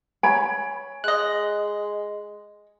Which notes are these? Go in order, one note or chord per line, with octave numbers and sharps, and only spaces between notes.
C#5 G#5 B5
G#3 D#5 F#6